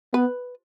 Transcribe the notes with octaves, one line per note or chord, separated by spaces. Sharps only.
B3 B4